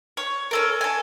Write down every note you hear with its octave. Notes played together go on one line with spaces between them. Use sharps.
C#5
C#4 A4 A#4
A4 G#5